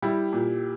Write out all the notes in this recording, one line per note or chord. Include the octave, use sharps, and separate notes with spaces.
G3 E4 G4
A#2